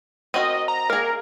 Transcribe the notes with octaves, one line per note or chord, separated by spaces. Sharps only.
C4 F#4 A#4 D#5
A#5
A#3 G#4 A#4